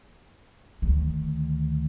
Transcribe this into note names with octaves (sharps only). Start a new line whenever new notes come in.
D2 D#3